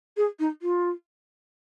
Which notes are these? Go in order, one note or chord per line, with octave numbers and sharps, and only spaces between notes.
G#4
D#4
F4